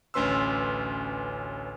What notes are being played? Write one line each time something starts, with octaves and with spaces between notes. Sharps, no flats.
A1 D2 C#4 B4 C6 E6